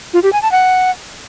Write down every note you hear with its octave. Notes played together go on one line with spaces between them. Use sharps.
F4
G4
G#5
A5
F#5